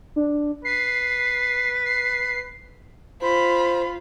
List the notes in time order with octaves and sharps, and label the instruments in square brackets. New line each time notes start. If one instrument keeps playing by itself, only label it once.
[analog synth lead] D4
[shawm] B4 [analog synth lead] C7
[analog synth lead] C7
[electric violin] F4 [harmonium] C5 [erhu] B5